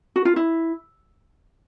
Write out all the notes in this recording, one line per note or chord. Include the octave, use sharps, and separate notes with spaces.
F#4
F4
E4